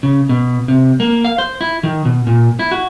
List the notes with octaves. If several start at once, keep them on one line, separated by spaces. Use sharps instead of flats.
C#3
B2
C3
A#3
F5
C5
E4
D#3
B2
A#2
E4
F#4